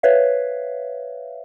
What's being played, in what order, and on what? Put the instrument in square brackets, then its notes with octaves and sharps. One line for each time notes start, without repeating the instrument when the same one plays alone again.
[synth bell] B4 C#5 E5 F5